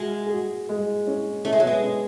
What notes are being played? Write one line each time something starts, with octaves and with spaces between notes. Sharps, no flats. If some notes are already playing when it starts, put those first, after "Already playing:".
Already playing: G#3 F#4
G#4
F#4
G#3
C#4
A3 C#4
G#3
F#3
B3
G#3
C#4